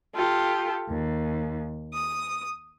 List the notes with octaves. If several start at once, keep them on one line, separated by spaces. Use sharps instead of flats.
F4 G4 A4
D#2
D#6